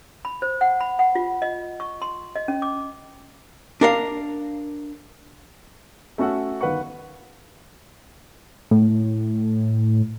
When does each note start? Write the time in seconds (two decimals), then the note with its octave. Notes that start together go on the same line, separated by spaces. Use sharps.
0.25 B5
0.42 C5
0.61 F#5
0.80 B5
0.99 F#5
1.15 F4
1.42 D#5
1.80 C#6
2.02 C6
2.36 D#5
2.48 C#4
2.62 D6
3.81 D4 A#4 F5
6.18 A3 C#4 F#4 A4 F#5
6.61 G1 D#3 B4 F5 F#5 C#6
8.71 A2